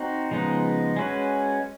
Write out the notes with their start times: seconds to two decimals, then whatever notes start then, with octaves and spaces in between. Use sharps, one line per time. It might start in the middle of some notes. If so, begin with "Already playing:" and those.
Already playing: C4 D#4 F#4
0.31 C#3 F3 G#3 B3 D#4
0.96 G#3 C#4 F#4 B4